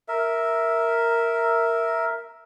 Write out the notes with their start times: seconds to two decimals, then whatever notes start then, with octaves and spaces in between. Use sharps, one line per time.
0.08 A#4 E5